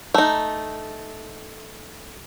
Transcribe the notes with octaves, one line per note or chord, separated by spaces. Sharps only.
A3 D#4